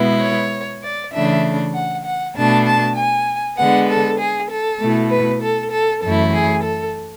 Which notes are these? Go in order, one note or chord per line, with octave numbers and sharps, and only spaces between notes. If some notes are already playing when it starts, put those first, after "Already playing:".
Already playing: B2 G#3 B3 E4
C#5
D5
C#3 E3 A3 D4 E5
F#5
F#5
B2 A3 D4 A5
A5
G#5
D3 G#3 B3 F#5
A4
G#4
A4
B2 A3 E4
B4
A4
A4
F#2 E3 A3 E4 A4
G#4
A4